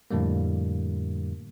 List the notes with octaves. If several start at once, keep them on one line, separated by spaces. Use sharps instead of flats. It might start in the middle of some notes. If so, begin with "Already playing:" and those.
F2 A2 D3 G3 A#3